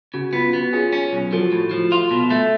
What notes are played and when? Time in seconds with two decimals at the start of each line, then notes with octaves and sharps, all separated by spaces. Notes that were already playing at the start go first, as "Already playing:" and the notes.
0.14 C#3 F#4
0.33 B3 F4
0.53 B3 F#4
0.73 C#4 F4 G#4
0.93 C#4
1.13 B1
1.32 F3 F#4 A4
1.52 A2
1.71 F3
1.92 F4
2.11 B2
2.30 A3